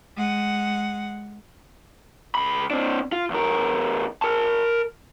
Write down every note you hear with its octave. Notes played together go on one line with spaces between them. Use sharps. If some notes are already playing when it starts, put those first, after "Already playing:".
G#3 F#5
C#2 B5
C4 D4
F4
E2 A#4
A#4 A5